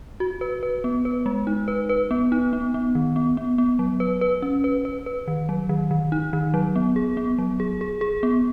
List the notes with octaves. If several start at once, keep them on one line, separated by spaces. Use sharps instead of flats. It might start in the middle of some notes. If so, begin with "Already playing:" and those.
F#4
B4
B4
B3
B4
G#3
D#4
B4
B4
B3
D#4
B3
B3
D#3
B3
B3
B3
F#3
B4
B4
C#4
B4
B4
B4
D#3
F#3
D#3
D#3
D#4
D#3
F#3
B3
G#4
B3
F#3
G#4
G#4
G#4
B3